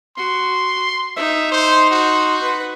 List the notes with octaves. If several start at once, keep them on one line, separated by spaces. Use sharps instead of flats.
F#4 C6
D#4 E5
C5 C6
F#4
B4